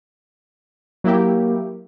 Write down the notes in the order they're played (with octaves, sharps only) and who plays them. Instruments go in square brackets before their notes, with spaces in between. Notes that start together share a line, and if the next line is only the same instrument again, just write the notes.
[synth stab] F#3 E4 G4 [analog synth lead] A#3